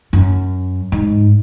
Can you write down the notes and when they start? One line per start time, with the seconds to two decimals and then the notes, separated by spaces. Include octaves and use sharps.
0.13 F#2
0.92 G#2